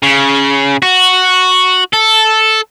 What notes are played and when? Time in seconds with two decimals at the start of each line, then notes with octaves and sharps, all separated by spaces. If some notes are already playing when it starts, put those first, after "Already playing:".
0.03 C#3
0.82 F#4
1.93 A4